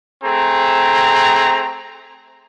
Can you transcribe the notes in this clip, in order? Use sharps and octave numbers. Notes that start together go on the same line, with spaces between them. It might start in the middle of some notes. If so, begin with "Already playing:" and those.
A3 C4 G#4 A#5